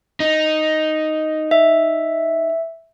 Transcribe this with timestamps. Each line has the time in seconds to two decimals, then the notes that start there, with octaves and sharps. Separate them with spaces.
0.20 D#4
1.51 E5